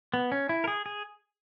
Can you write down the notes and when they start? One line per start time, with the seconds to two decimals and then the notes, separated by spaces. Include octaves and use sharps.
0.14 B3
0.32 C#4
0.49 E4
0.64 A#4
0.67 G#4
0.86 G#4